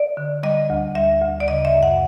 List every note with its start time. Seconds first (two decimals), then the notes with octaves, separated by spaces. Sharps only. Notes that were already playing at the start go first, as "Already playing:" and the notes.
Already playing: D5
0.17 D3
0.43 G3 D#5
0.70 D2
0.95 G3 E5
1.22 D2
1.40 D5
1.48 C#3 D#5
1.65 E5
1.74 F#2
1.83 F#5